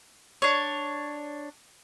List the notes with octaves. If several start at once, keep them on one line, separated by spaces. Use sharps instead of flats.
D4 C#5